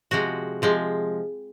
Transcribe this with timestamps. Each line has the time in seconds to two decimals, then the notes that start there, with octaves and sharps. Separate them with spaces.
0.11 C3 F3 G#3 F#4
0.62 C3 F3 G#3